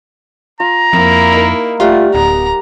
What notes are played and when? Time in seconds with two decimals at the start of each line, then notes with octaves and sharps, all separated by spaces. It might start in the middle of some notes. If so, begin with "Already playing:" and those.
0.60 F4 A#5
0.93 F2 A#3 E4
1.33 D#4 A#4
1.80 G3 A3 F4 F5 F#5
2.15 D1 B3 A#5